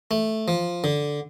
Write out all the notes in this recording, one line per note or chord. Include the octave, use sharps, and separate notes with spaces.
A3
F3
D3